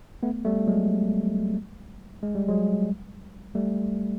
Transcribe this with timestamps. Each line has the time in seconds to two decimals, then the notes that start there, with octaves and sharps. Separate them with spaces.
0.23 A3 B3
0.45 G3 A3
0.67 F#3 G#3
2.23 G#3
2.35 G3
2.48 F#3 G#3
3.55 G3 A3